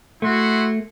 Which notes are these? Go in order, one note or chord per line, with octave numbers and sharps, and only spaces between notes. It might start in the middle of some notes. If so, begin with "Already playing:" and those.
A3 E4 F#4 C6